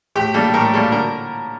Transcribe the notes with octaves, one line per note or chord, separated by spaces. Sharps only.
A2 G4
G3 A#3 D4 A4
A2 A#4
G3 A#3 D4 A4
D3 A#4